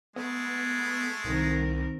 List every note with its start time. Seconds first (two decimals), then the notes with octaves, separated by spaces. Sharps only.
0.16 G#3 A3 B3
1.25 C2 D#3 C4 A#4